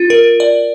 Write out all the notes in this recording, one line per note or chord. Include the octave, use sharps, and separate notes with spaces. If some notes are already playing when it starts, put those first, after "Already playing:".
Already playing: F4
A#4
D5